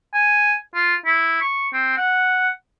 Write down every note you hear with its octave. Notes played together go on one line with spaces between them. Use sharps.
G#5
F4
E4
C#6
C4
F#5